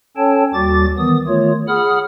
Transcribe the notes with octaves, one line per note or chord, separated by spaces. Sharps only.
C#4 A4 C#5 G5 A5
D#2 G3 F#4 D6 A6
D#3 E3 B3 D#6
D#3 A3 F4 C#5
G#4 F#5 B5 D#6 F6